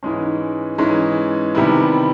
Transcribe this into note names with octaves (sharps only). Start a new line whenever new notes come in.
G#2 E3 G#3 C#4
G#2 E3 G#3 C#4
C3 D#3 G3 B3 E4